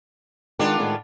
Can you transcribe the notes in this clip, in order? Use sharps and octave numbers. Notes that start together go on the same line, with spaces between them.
D#3 G#3 B3 D4 F4
A2 D#3 G#3